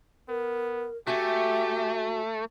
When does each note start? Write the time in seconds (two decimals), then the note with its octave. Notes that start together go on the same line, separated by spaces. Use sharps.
0.29 B3 A#4
1.07 A3 F#4 G4 E5 G#5